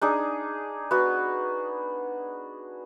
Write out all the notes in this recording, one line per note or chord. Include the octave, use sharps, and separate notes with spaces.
D4 D#4 G#4
B3 F#4